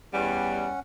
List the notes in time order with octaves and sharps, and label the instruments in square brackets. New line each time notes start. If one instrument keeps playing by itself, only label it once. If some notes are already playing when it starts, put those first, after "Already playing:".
[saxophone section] E2 G3 [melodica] C#4 F#5